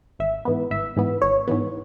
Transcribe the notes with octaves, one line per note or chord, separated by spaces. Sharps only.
G#1 E5
G#2 E3 B3
G#1 E5
G#2 E3 B3
G#1 C#5
G#2 E3 B3